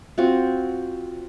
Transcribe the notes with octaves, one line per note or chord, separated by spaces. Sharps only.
C4 F4 F#4